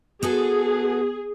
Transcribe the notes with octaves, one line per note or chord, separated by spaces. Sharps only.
B3 F#4 G#4 A4